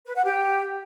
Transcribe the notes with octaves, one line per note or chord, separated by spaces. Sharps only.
B4
F#5
G4